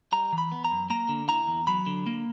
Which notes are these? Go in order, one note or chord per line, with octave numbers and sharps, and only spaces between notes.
G3 A#5
E3
B5
B3
A#5
F#2
A#3 A#5
D3
E4 A#5
E2
F#3 B5
D3
A#3